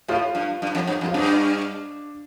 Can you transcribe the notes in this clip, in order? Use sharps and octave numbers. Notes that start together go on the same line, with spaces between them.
A2 F4
G2
G2
F2
G2
F2
F4
G2 D4